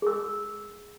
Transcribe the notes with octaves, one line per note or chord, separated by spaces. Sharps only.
G#4 E6